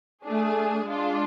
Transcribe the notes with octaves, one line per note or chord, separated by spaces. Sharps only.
A3 D4 G#4
G#3 D4 F4